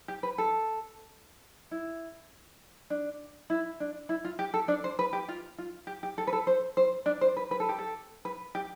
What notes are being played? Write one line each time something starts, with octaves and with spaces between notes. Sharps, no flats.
G4
B4
A4
E4
D4
E4
D4
E4
F4
G4
A4
D4 D5
C5
B4
G4
F4
F4
G4
G4
A4
B4
A4
C5
C5
D4 D5
C5
B4
B4
A4
G4
A4
B4
G4